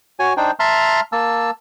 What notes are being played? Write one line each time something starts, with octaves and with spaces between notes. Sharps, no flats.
F#4 C#5 G#5
D4 D#4 C5 G5
E5 A5 A#5 C6 F6
A#3 A5 E6